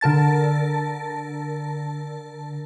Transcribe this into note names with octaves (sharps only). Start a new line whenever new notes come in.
D3 A#4 A5 A6